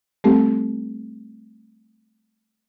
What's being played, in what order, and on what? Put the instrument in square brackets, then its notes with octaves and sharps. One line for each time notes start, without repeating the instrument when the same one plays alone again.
[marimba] G3 A3 C4 G4 A4